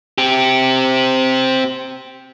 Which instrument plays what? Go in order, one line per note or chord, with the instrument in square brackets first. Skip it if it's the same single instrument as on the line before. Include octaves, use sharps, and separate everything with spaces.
[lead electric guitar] C4 G4